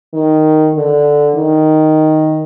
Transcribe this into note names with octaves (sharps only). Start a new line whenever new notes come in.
D#3
D3
D#3